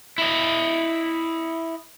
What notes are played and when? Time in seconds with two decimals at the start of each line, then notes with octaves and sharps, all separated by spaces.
0.18 E4 D#5